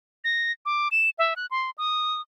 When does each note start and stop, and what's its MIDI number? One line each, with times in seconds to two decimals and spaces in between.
0.24 0.52 94
0.66 0.88 86
0.92 1.10 100
1.19 1.34 76
1.36 1.46 90
1.51 1.70 84
1.78 2.21 87